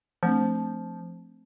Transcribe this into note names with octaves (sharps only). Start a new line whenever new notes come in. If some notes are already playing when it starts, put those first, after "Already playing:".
F3 A3 C4 D4